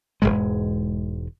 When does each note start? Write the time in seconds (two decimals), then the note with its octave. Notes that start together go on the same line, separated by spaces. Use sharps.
0.22 E1 C2 G#2 G#3